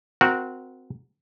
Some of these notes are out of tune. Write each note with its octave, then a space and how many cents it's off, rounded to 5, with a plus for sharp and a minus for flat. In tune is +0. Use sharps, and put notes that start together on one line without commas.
C4 -15 F#4 -15 A#4 +0